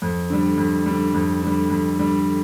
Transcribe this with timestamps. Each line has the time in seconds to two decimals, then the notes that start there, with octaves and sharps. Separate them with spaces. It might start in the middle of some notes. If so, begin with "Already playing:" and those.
0.02 F2
0.30 D3 G3
0.58 F2
0.86 D3 G3
1.14 F2
1.42 D3 G3
1.70 F2
1.98 D3 G3